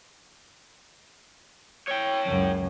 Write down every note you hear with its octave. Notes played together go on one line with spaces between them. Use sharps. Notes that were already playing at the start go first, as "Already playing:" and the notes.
C#5 G5
C#2 F#2